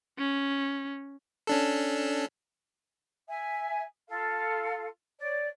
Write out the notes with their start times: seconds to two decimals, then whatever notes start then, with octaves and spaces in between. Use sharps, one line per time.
0.19 C#4
1.47 C#4 D4 A4
3.28 E5 G#5
4.09 F4 A4 F5
5.20 C#5 D5